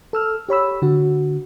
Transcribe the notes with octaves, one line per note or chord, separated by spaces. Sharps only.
A4 E6 F6
G4 C#5 B5 E6
D3 F#4